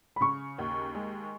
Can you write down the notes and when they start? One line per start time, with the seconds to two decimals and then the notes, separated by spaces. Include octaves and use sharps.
0.16 B5
0.21 C#3 C#6
0.58 D#2
0.95 G#3